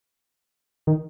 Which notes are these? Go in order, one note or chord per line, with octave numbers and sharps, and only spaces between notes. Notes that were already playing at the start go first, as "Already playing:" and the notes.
D#3